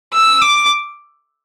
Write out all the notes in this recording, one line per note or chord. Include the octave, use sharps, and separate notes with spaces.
E6
D6